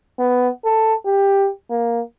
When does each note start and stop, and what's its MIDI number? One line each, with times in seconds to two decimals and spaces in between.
0.19 0.49 59
0.65 0.94 69
1.05 1.48 67
1.70 2.00 58